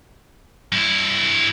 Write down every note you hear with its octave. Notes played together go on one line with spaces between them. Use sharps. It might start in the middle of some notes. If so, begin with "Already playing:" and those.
G2 E4